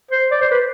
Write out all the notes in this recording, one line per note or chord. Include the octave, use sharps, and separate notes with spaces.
C5
D5
C5
B4